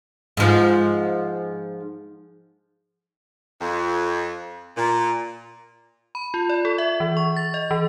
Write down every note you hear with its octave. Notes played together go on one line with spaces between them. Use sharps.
G#2 F3
F2
A#2
B5
F4
D5
A4
E5
E3
C#6
A6
D#5
E3